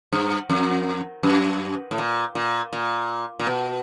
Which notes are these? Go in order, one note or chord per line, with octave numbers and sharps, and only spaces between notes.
G2
F2
F#2
A2
A#2
A#2
A#2
A#2
B2